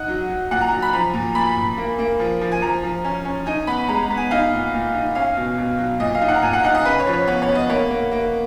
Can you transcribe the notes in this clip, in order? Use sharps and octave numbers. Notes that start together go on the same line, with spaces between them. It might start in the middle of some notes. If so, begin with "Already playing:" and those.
Already playing: D#4 F#5
F#3
F#3
A#2 F#5
A#5
F#3
B5
F3 A#5
A#2
A#2 B5
A#2
A#3
A#3
F3
F3
G#5
F3 A#5
F3
C#4
C#4
D#4 G#5
B3 B5
G#3 A#5
A#5
B3
G#5
D#4 F5
A#2
A#2
D#4
C#4 F5
B2
B2
F#3
A#2 D#5
F5
D#4
F#5
A#5
A#2 G#5
F#5
D#4 F#5
D#5
C#3 B4
C#5
F3
C#5
B3 C#5
C#5
B3
D#5
A#3 C#5
A#3
A#3